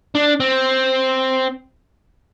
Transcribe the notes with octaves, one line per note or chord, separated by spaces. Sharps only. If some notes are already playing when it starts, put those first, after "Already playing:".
D4
C4